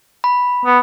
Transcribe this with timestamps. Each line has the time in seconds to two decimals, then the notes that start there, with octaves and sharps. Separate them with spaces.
0.24 B5
0.65 B3